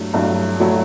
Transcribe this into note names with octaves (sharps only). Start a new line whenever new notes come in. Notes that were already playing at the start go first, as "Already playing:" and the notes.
Already playing: G2 F#3 A3 E4
G2 F#3 A3 E4
F#3 A3 E4